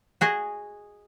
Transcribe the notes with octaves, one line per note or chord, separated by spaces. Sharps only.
F#4 G#4 D#5